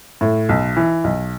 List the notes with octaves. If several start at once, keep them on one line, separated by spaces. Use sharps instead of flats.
A2
B1
E3
B1